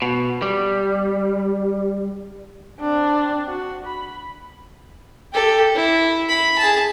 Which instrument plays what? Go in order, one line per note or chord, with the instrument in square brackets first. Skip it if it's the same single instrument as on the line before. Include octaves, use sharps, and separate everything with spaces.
[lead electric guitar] B2
G3
[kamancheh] C4 D4
F#4
B5
[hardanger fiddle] G4 A4
E4
B5
G#4 A5